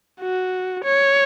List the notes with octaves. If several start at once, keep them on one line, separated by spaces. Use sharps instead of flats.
F#4
C#5